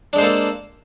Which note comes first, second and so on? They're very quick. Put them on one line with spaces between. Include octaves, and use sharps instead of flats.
D4 G#3 C5 A#3 A4